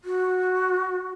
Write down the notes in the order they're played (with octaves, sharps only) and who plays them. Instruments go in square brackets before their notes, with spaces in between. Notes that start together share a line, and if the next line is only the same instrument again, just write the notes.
[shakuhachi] F#4